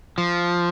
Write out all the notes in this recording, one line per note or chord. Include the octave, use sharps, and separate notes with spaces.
F3